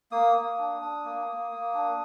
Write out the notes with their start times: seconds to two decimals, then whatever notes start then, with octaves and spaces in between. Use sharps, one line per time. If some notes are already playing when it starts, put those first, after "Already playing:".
0.11 A#3 D#6
0.35 A#3
0.58 D4
0.82 D4
1.05 A#3
1.28 A#3
1.52 A#3
1.74 D4